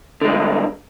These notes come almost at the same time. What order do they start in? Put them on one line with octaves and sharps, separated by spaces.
D3 G#3 G2